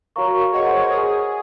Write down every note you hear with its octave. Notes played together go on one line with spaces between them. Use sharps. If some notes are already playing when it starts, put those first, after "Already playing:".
F#4 A#4 C#5 F5 A#5 C#6
G#4 C#5 D#5 F#5 C#6
C5
A#4
G#4